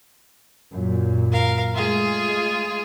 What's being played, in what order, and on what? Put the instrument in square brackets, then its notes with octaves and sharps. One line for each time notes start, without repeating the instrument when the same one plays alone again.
[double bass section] F#2 A#2 F#3
[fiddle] A#4 F5
[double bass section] G#3 A3 [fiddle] F4 G#4